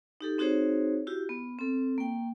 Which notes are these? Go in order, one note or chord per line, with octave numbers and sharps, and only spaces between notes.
D#4 G4 A4
C4 D#4 F#4 G#4 C5 C#5
E4 F#4 G4
B3
C4 A4
A#3 G5